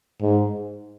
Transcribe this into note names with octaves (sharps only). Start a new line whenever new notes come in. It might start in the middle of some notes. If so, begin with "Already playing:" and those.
G#2